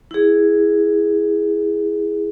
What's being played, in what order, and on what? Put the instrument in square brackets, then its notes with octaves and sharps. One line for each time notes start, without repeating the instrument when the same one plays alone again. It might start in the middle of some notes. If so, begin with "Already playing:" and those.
[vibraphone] E4 G#4